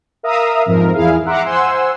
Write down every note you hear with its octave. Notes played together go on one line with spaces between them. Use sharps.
A#4 E5 F5 A#5 D#6 E6
F2 G#2 F3 A#4
E2 E4 G#4 F5
E5 F#5 A#5 C6 D6
C5 F#5 G#5 C6 E6